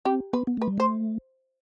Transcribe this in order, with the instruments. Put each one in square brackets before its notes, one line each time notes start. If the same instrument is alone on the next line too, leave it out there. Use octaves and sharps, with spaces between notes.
[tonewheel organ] C4 [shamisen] G4
[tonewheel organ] B3 [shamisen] B4
[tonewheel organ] B3
[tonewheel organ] A3 [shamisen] B4
[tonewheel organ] G3
[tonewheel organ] A3 [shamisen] C5